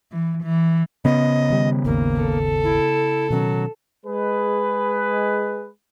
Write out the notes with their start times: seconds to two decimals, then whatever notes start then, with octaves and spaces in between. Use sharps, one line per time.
0.12 E3
0.43 E3
1.05 C#3 B3 D#5
1.50 D#3 G3
1.85 G#1 D#2 A#3
2.22 A4
2.63 E4
3.30 B2 D#3 F#3 C#4
4.05 G#3 G#4 B4